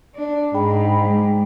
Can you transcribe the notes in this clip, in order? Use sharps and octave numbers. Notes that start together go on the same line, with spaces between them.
D4
G#2 G#4 G5 B5
G#3